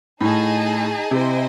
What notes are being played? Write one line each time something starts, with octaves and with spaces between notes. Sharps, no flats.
A2 D#4 G#4 D#5 A5
C3 E4 C5 D#5 G#5